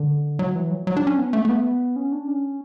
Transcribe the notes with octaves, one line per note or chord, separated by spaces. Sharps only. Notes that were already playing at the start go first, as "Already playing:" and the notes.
Already playing: D3
F#3
E3
F#3
F#3
D4
C#4
B3
A3
A3
B3
C#4
D4
C#4